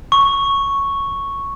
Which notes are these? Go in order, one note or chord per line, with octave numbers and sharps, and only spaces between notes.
C#6